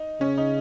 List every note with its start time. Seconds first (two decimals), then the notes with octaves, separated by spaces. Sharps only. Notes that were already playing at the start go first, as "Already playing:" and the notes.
Already playing: D#4
0.21 C#3 C#4
0.38 D#4